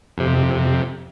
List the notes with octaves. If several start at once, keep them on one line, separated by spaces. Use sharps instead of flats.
F2 C3